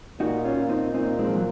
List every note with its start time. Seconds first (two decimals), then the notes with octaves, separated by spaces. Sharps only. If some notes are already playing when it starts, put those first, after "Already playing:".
0.20 A#2 D#4 F#4
0.45 C#4 F4
0.58 A#2
0.69 C4 D#4
0.94 A#2 C4 D#4
1.19 G#3 C4
1.28 F3
1.36 F#3